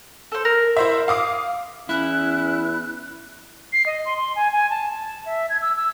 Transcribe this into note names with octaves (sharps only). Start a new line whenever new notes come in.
A4 C5
A#4
E4 C5 E5
F5 D6 D#6
E2 C#4 E4 F#6
C7
D#5
C6
C6
G#5
G#5
A5
A5
E5
G#6
E6
E6